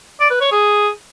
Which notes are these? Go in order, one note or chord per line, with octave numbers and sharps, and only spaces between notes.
D5
B4
C#5
G#4